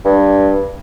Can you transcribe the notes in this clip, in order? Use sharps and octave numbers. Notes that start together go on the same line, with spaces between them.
G2